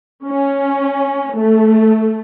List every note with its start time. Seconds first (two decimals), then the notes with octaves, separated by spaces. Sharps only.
0.24 C#4
1.35 A3